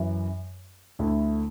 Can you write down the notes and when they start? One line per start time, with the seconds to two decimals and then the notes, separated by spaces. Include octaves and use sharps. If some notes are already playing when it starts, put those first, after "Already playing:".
Already playing: F#2 E3
0.99 D2 D3 A3 E4 A4